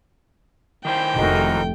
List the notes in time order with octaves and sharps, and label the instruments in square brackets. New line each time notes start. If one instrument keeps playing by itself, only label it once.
[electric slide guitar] D#3 E4 C5 [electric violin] G5
[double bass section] F1 A3 [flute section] D#4 F#4 A#4